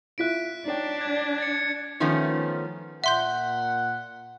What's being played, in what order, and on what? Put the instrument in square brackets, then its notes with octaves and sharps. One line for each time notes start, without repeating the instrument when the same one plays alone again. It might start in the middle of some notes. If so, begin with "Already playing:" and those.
[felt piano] E4 F4 E5 [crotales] F#6 B6 D7
[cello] D4 [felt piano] D#4 C#5 G5
[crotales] G#6
G#6 A6 C#7
[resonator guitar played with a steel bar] D#3 F3 A3 B3 C#4
[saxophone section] A#2 F#5 [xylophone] E5 C6 G6